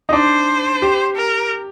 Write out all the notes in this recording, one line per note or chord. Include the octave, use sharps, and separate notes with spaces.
D#4
D4 C5
G4
A#4